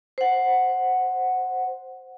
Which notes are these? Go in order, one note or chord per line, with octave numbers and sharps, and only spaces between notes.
C5 F#5